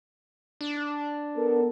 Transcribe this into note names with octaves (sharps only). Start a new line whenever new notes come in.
D4
B3 A4 A#4